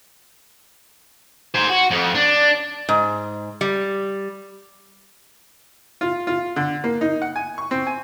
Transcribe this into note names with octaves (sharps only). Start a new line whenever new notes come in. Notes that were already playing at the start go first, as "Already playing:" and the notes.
G#4 C5
F#4
F2
D4
G#2
G3
F4
F4
D3
A#3
D#4
F#5
G#5
C#6
C4
G#5